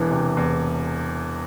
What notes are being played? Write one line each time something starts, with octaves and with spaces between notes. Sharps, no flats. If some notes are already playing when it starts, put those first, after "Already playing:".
Already playing: E1 E2 E3
C3
E2